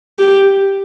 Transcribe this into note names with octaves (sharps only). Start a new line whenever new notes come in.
G4